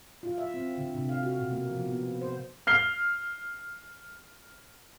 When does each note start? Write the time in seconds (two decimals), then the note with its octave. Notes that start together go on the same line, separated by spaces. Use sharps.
0.23 F4
0.38 E5
0.54 C4
0.77 D3
0.94 C3
1.09 F5
1.23 F#4
1.39 B2
1.52 A#3
1.71 F3
1.85 B3
2.21 C5
2.67 F6 C7 G7